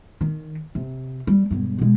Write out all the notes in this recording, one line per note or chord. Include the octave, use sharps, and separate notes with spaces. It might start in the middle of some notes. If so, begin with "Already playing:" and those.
D#3
C3
G3
E1 G2
B2 G#3